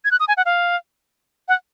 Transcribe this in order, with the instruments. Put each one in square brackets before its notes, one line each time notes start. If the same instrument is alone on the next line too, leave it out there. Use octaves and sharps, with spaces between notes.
[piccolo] G#6
F#6
D#6
G#5
F#5
F5
F#5